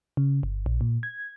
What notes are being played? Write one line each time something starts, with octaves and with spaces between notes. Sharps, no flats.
C#3
G1
A#1
A#2
G#6